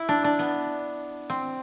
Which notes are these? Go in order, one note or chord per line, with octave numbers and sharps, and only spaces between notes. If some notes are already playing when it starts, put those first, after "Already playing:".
Already playing: E4
D4
D4
B3
C4